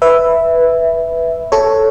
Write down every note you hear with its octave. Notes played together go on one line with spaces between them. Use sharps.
B4 E5
A4 C#5